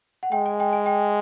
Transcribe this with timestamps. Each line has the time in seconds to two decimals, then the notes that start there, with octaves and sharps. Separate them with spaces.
0.23 F#5
0.32 G#3 G5
0.46 G#5
0.60 G5
0.73 G#5
0.86 G5